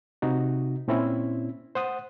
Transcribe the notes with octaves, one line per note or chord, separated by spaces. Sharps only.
C3 D#4 F#4
A#2 C4 C#4 E4
C5 F#5 D#6